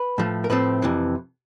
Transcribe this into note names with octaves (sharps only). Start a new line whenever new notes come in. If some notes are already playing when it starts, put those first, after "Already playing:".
Already playing: B4
A2 F3 A3
A#4
A2 F3 A3 C4 B4
F2 C3 E3